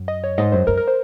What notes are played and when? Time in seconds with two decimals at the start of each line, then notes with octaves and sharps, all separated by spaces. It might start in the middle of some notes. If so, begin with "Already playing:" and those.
Already playing: F#2
0.08 D#5
0.24 C#5
0.38 G#2 D#5
0.52 F#2 C5
0.67 F#2 A#4
0.77 A#4
0.88 C5